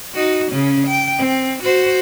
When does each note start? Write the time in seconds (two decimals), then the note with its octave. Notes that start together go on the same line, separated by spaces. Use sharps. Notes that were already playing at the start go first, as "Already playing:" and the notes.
0.14 D#4 F#4
0.51 C#3 C#4
0.87 G5
1.18 C4
1.63 F#4 C5